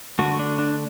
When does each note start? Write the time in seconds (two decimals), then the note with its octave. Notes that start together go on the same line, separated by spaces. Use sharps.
0.19 D3 A3 F#4
0.39 D4
0.59 D4